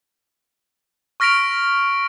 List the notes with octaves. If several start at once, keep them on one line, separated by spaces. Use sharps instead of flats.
C#6 F6 A#6 B6 D7 F7